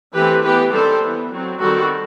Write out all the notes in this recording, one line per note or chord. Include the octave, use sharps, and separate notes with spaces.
E3 A3 C4 G4 B4
E3 B3 G4 B4
D#3 G3 C4 A4 C5
E3 B3
F#3 C4
D#3 G3 C4 F#4 A4